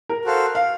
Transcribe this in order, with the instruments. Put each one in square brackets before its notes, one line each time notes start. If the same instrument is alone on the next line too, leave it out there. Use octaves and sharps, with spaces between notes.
[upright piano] A#4
[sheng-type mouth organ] F#4 A4 C5 F5
[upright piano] F5